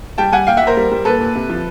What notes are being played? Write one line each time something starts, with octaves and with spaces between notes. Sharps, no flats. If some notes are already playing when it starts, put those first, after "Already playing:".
G3 G5 A5
G3 F#5 G#5
A#2 F5 G5
A#2 E5 F#5
A#4 C5
G3
G3
A#2 A4 B4
A#2
C3
F3